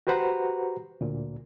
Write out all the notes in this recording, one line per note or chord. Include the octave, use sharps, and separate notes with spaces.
F#4 G4 B4 C5 F#5 A#5
D2 A#2